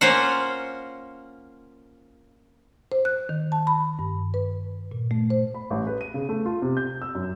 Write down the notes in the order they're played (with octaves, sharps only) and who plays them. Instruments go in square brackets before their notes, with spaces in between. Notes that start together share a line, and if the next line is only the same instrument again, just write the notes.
[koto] A#3 C#4 F4 C5 F#5
[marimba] C5
F#6
D#3
A5
B5
G2
B4
A#2
A3
C5
[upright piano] B5
A1
B4
D#7
C#3
A3
F4
C3
G6
E6
F#2